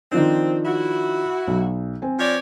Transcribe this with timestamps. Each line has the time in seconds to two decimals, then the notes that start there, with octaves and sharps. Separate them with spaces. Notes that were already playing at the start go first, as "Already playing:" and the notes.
0.12 D#3 F3 C4 D4
0.65 E4 F#4
1.48 B1
2.02 C4 G#5
2.19 F3 C#5 D5